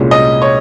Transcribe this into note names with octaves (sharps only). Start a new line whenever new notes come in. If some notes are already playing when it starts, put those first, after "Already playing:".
Already playing: C2 A#2 G#3 C#4 F4
D#5
C#5